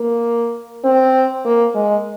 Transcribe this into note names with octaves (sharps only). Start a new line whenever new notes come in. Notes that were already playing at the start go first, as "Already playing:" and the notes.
Already playing: A#3
C4
A#3
G#3